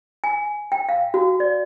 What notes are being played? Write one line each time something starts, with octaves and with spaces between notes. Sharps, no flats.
G#5
G5
F5
F#4
D5